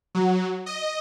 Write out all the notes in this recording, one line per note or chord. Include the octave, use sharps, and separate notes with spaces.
F#3
D#5